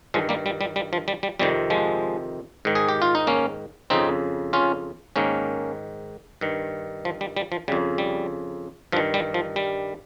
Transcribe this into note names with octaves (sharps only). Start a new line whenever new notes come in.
G2 D#3 F3 G#3
G3 A#3
G3
G3
G3
F3
G3
G3
F2 C3 D#3 G3
F3 G#3
G#2 D#3
G#4
G4
F4
D#4
A#3 C#4
F2 C#3 C4 D#4
C#4 F4
G#2 D#3 A#3 C#4
G2 D#3
F3
G3
G3
F3
F2 C#3 G3
G3
G2 D#3 F3
G3
F3
G3